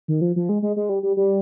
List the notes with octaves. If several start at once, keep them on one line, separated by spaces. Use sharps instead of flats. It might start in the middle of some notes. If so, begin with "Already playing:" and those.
D#3
F3
F3
G#3
G#3
G#3
G3
G3
G3